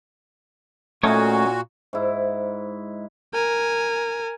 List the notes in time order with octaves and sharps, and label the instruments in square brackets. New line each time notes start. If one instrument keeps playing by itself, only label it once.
[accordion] A#2 F#4 [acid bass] A3 [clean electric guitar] C#4 D#4 C#5
[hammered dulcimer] G#2 E4
[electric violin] A#4 G#5